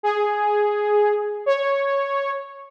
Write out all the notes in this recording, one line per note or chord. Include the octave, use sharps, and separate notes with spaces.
G#4
C#5